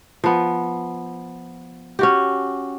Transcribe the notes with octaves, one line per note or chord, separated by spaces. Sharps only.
F3 B3
C#4 F#4 G4